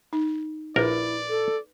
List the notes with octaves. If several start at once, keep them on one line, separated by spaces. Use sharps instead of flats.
D#4
A#1 E4 A#4 B4 D5
A4